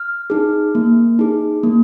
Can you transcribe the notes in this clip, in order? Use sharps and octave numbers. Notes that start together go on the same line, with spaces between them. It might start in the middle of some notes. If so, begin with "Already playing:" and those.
Already playing: F6
D#4 G#4
A#3
D#4 G#4
A#3